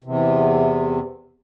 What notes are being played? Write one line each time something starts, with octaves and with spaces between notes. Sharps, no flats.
E2 C3